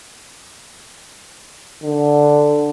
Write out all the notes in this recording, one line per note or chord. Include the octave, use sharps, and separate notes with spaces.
D3